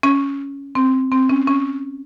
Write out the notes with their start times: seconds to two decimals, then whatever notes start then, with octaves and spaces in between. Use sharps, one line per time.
0.03 C#4
0.75 C4
1.12 C4
1.29 C#4
1.47 C#4